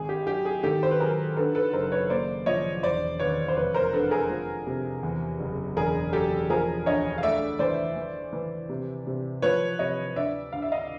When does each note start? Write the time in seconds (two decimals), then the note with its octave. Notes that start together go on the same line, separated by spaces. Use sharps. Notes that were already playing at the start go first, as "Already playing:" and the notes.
Already playing: G#1 G#4
0.09 G4
0.27 F#3 G4
0.45 G#4
0.63 D#3 G4 A4
0.83 C5
0.91 B4
1.00 F#3 G#4 A#4
1.37 D3 A4 B4
1.55 A4 B4
1.73 F#1 A#4 C5
1.92 B4 C#5
2.10 A#3 C5 D5
2.46 F3 C#5 D#5
2.83 E1 C5 D5
3.20 D#2 B4 C#5
3.48 C5
3.56 F1 B4 C#5
3.74 A#4 C5
3.93 D3 A4 B4
4.11 G#4 A#4
4.30 F3
4.67 C3
5.03 E2
5.40 F#1
5.77 E1 G#4 A#4
6.13 F#3 G4 A4
6.50 F3 G#4 A#4
6.86 D2 C#5 D#5
7.18 F5
7.23 A3 D5 E5
7.59 E3 C5 D5
7.96 E3
8.33 E3
8.69 C3
9.07 C3
9.42 F3 B4 C#5
9.79 C3 C#5 D#5
10.16 D2 D5 E5
10.52 D2 F5
10.62 E5
10.72 D#5 F5